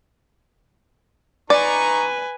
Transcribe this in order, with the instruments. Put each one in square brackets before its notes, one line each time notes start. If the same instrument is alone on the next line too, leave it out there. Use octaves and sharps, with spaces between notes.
[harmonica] D#4 A#5 C#6 [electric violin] B4 G#5 [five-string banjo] D5